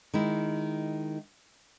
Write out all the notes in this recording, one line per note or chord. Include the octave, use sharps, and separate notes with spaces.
D#3 G#3 E4